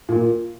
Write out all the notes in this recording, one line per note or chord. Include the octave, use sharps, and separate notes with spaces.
A#2